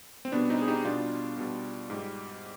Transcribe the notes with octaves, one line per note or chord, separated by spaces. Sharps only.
C4
B2 G3 B3 D4
C4 D#4
G#4
D#4 G4
B2 G3 D4 F4
B2 G3
G#2 G3